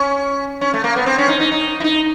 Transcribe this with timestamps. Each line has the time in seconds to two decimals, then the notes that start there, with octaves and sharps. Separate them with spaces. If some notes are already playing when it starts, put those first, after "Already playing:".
Already playing: C#4
0.61 C#4
0.74 A3
0.84 A#3
0.96 B3
1.06 C4
1.18 C#4
1.28 D#4
1.40 D#4
1.51 D#4
1.80 E4
1.84 D#4